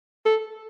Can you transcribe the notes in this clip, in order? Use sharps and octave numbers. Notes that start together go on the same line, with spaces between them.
A4